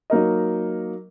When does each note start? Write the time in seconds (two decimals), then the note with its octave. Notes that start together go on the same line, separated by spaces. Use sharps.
0.10 F#3 A#3 D#4 A#4 D#5